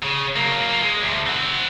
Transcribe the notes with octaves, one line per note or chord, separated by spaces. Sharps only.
C#3
F#3 A#3
G#3
D2
C4 F#5